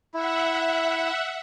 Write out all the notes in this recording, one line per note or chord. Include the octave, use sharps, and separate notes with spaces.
E4 E5 F#5